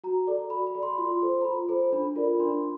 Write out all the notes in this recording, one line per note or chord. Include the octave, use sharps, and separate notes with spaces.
F#4 A#5
A4 D5
F#4 B5
B5
A4 D5
C6
F4 C6
A4 C5
A#5
F4 B5
A4 C5
D4 B5
F4 A#4 D5
D4 C6